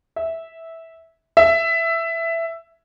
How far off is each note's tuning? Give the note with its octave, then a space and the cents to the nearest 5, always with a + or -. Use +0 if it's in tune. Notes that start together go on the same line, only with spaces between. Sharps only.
E5 -10
E5 +10